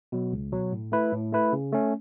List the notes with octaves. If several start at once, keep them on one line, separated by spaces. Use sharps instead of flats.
B2 F#3
C#2
B2 F#3
A2
A3 E4 B4
A2
A3 E4 B4
C#3
A3 C#4